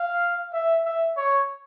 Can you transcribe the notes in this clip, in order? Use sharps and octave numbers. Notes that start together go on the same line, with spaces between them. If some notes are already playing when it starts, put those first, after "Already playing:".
Already playing: F5
E5
E5
C#5